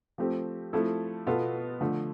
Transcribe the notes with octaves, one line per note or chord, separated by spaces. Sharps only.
F3 A3 C4 G4
F3 A3 C4 E4 A4
B2 B3 F4 A4
D3 F3 A3